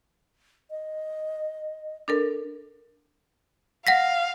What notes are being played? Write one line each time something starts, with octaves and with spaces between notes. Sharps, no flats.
D#5
D4 A4 A#4
F5 F#5 A#6 B6